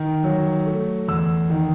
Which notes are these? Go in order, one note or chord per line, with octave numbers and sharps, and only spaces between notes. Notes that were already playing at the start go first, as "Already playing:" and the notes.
Already playing: D#3
F#3
A3
E2 E6
D#3